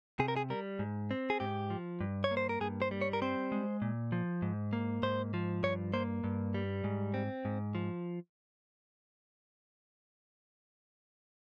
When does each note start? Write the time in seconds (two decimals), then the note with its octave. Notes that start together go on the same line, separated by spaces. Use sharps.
0.19 C3 G#4
0.28 A#4
0.37 G#4
0.50 G3 A#4
0.79 G#2
1.11 C4
1.30 G#4
1.40 G#2 G4
1.70 F3
2.01 G2
2.24 C#5
2.31 A#3
2.37 C5
2.49 A#4
2.61 G2 G#4
2.82 C5
2.91 G3
3.01 C#5
3.13 A#4
3.22 C4 C5
3.52 G#3
3.82 A#2
4.12 F3
4.42 G#2
4.73 A#3
5.03 G#2 C5
5.34 F3
5.63 G2 C#5
5.94 A#3 C5
6.24 G2
6.54 G3
6.84 G#2
7.14 C4
7.45 G#2
7.75 F3